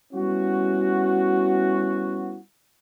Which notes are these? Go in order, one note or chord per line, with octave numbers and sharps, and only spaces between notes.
G3 B3 C#4 E4 F#4